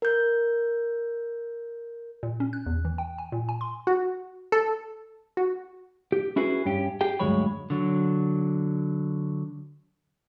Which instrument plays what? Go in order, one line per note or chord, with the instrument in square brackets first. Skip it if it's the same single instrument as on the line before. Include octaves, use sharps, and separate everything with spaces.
[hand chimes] A#4 G6
[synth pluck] A#2
C#4
F#6
E2
E3
G5
G#5
A#2
G#5
C6
F#4
A4
F#4
[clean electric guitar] G4
C#4 E4 F#4 G#4 B4
G2 C#4 G4
G4 G#4 G5
D2 G2 F#3 G#3 C#5 B5
[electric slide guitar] D3 F#3